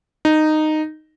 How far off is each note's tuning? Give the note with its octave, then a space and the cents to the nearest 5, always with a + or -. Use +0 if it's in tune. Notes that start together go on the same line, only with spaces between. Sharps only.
D#4 -10